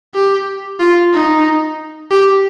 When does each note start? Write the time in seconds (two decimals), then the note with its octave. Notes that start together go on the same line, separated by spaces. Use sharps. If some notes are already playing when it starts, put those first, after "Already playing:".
0.14 G4
0.80 F4
1.13 D#4
2.11 G4